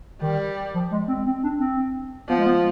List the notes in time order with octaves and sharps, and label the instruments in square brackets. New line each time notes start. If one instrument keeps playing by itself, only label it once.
[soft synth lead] D#3 [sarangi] G3
[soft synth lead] F3
G#3
C4
C4
D4
C4
[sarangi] F3 [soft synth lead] B3
[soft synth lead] G#3
B3